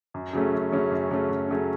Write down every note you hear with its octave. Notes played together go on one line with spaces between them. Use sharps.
F#2
C#3 F#3 A3 C#4
F#2
C#3 F#3 A3 C#4
F#2
C#3 F#3 A3 C#4
F#2
C#3 F#3 A3 C#4